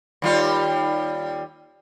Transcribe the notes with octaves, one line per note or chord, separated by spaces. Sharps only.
D#2 G3 F4